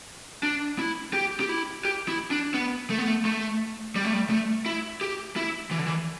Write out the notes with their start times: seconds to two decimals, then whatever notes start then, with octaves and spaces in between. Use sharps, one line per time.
0.43 D4
0.79 E4
1.13 G4
1.40 G4
1.49 E4
1.85 G4
2.08 E4
2.31 D4
2.54 B3
2.90 A3
2.98 B3
3.08 A3
3.25 A3
3.96 G3
4.05 A3
4.13 G3
4.30 A3
4.66 E4
5.01 G4
5.36 E4
5.71 E3
5.79 D3
5.86 E3